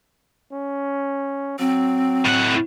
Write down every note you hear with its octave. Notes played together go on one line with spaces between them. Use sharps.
C#4
F#3 C4
A2 F#5